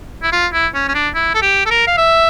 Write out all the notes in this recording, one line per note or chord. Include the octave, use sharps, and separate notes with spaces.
E4
F4
E4
C#4
C#4
D4
E4
A4
G4
A4
A#4
F5
E5